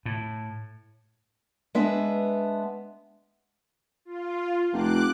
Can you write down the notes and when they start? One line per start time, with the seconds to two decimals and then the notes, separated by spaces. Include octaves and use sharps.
0.05 A2
1.75 G#3 B3 D4 E5
4.05 F4
4.73 F1 D6 F#6